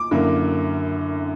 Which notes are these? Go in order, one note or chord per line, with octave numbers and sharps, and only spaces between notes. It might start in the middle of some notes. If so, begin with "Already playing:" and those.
Already playing: D6
F#2 D3 A#3 E4